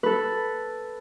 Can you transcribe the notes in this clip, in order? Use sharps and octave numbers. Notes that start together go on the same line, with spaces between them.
A4 B4